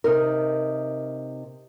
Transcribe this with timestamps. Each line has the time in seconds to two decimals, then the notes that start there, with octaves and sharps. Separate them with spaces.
0.04 C3 D#4 A#4